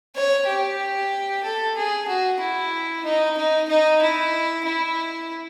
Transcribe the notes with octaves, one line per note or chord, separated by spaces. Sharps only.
C#5
G4
A4
G#4
F#4
E4
D#4
D#4
D#4
E4
E4